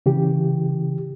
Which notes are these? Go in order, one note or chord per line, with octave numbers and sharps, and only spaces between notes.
C#3 E3 G4